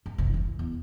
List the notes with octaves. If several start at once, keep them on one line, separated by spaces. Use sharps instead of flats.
F#2
F#1 C2
E3 F3
E2